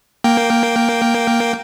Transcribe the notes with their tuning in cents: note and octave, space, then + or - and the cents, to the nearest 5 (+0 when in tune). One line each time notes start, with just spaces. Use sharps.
A#3 +0 G5 +0